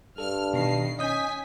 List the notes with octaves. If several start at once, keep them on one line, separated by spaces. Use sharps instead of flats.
G2 A4 F6
B2 D#3 C7
C#4 D#5 G#5 D#6 G6 B6